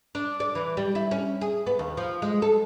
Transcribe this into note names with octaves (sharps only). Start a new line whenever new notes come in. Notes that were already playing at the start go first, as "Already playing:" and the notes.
D4
D5
E3
G3
E4
C#4
G#4
B3
D#2
F3
G#3
A4